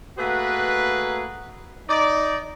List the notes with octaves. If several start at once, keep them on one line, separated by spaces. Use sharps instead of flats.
A3 A#3 F#4 G#4 B4
D#4 D5